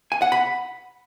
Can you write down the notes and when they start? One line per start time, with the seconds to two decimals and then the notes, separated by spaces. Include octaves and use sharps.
0.12 G#5
0.22 F#5
0.32 B5